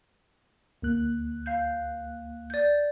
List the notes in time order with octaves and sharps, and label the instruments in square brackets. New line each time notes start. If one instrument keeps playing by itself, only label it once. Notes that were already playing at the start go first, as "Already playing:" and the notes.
[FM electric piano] D2 A#3 F#6
[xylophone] F5 G6
D5 G6